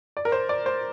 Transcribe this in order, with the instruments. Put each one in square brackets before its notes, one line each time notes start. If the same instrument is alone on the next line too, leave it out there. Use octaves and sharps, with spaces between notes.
[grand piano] D5
A#4
C5
D5
C5